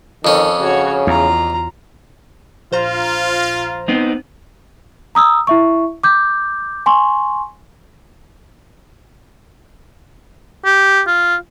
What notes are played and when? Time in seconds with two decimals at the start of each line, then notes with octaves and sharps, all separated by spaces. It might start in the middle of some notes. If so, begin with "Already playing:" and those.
0.25 F2 D#3 C#4 A4
0.61 C#3 F#4 C#5
1.07 E2 F4 A#5
2.72 A#1 F4 C5 A#5
3.88 B3 C4 D#4
5.15 A#5 D#6 E6
5.47 E4 E5 C#6
6.04 D6 G6
6.86 G#5 C6 C#6
10.65 G4
11.07 F4